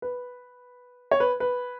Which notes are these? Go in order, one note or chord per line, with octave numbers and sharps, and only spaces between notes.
B4
C#5
B4
B4